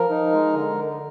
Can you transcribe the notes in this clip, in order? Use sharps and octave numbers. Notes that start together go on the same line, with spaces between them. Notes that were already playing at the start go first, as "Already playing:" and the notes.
Already playing: F3 A#4
D#4
G#3
D3